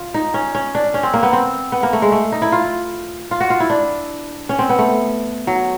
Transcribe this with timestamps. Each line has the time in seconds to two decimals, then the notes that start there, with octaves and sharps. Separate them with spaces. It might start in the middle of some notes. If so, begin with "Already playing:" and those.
Already playing: F4
0.14 D#4
0.34 C#4
0.55 C#4
0.75 D4
0.94 C#4
1.03 C4
1.14 A#3
1.23 B3
1.33 C4
1.72 B3
1.83 A#3
1.93 A3
2.02 G#3
2.12 A3
2.32 D#4
2.42 E4
2.52 F4
3.31 F4
3.40 F#4
3.50 F4
3.60 E4
3.70 D4
4.49 C#4
4.59 C4
4.69 B3
4.79 A3
5.47 F#3